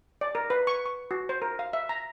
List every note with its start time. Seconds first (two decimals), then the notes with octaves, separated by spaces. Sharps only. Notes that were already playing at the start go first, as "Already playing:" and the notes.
0.21 D5
0.35 A#4
0.50 B4
0.67 C#6
0.86 C#6
1.11 F#4
1.29 C5
1.42 A#4
1.59 F5
1.73 E5
1.89 A#5